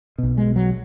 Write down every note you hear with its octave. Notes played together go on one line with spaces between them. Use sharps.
B1 B2
G#3
F#3